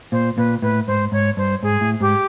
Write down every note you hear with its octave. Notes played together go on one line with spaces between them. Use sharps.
A#2 C5
A#2 B4
A2 B4
G#2 C5
G#2 C#5
G2 C5
G#2 G#4
A2
G#2 G4